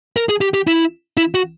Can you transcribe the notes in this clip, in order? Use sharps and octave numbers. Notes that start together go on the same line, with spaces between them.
A#4
G#4
G4
G4
E4
E4
F#4